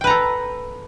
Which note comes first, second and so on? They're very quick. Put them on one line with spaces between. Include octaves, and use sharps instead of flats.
G5 B4 A#5 A4